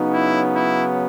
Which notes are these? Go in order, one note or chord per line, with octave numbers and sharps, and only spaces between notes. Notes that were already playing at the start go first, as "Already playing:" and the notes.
Already playing: C#3 F#3 B3 D#4
E4
E4